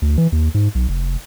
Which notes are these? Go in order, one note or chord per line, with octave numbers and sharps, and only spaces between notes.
D2
E3
D#2
G#2
B1
F1